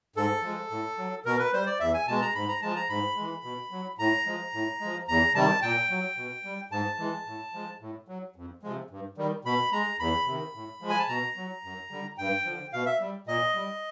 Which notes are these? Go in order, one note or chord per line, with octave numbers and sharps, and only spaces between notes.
G#2 A4
F3 G#3
A2
F#3
B2 A#4
B4
G3 C5
D5
E2 E5
G#5
B2 G#3 A5
A#5
G#2 B5
A#5
F3 G#3 A5
A#5
G#2 B5
E3 G#3
B2
F#3
A2 A#5
F3 G#3
A2
F3 G#3
E2 A#5
C3 D#3 G3 A5
A#2 G5
F#3
B2
G3
G#2 A5
E3 G#3
A2
F3 G#3
A2
F#3
F2
C3 F3 G#3
G2
D#3 G3
B2 B5
G#3 A#5
E2 B5
C3 D#3
A2
F3 G#3
G#5
A5
B2 A#5
F#3
F#2
D3 G3
G2 G5
D3 F3
B2 F5
E5
G3
A#2 D#5
G3